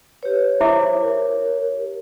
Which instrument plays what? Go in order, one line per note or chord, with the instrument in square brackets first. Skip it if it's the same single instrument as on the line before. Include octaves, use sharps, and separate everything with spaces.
[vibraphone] G4 C#5 [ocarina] B4
[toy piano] E4 E5 D6 [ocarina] C5
[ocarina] A#4